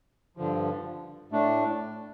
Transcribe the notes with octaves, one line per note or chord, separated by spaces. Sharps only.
G2 D3 F3
A2 A3 D4